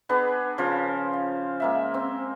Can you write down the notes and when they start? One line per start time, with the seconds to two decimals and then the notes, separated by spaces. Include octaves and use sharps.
0.09 B3 D4 G#4 B4
0.58 C#3 F3 F4 C5
1.13 F5
1.60 G#3 A#3 E5
1.94 C4